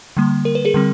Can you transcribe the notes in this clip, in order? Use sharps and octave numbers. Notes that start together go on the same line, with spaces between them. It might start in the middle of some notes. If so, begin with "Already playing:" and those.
D3 G3 A#3
A#4
B4
G#4 A#4
D3 G3 C4